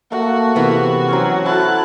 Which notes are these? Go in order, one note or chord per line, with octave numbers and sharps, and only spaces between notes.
A3 A#3 F#4 F#5
C3 E3 A#3 B3
F#3 C4 C#4
E4 F#4 A4 A5 F#6